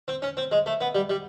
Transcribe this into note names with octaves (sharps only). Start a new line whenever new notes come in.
C4
C#4
C4
G#3
A3
B3
G3
G3